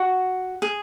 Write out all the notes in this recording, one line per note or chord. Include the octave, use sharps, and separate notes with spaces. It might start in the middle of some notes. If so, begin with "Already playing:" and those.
Already playing: F#4
G#4